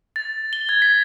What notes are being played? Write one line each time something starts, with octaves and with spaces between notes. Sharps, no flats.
A6
G7
G#6
B6